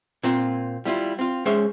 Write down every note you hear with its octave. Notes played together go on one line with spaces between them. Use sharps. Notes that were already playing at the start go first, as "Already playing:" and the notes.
A#2 C4 F4
G3 E4 F4
C4 F4
G#3 C#4 C5 C#5 E5